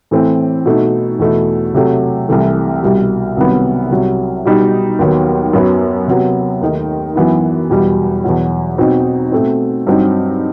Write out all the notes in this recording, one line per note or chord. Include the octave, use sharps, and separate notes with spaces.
A2 E3 A3 C4
B2 A3 D#4
E2 B2 A3 E4
C3 F#3 A3
C2 C3 E3 A3
C2 B2 G3
C2 C3 D#3 F#3 B3
C2 C3 F#3
B2 G3 D#4
D#2 D#3 F#3 B3
F#2 F#3 B3
C3 F#3 B3
D#2 D#3 A3 D#4
F#2 E3 B3 E4
E2 B2 G3
E2 B2 F#3
B2 F#3 C4 D#4
B2 A3 C4
G2 F#3 C4 D#4